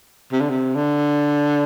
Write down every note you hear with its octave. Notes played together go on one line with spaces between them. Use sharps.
C3
D3
C3
D3